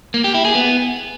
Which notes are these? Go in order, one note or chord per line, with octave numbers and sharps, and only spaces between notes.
A#3
G4
E4
G#4
B3